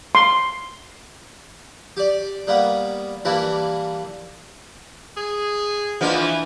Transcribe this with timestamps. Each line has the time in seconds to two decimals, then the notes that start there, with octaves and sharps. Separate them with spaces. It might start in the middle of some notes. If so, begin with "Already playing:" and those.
0.15 C6
1.97 G4 D5
2.47 G3 A#3 B3
3.25 E3 G3 A#3 D4 E4
5.17 G#4
6.01 E3 F3 A#3 D4 D#5 F#5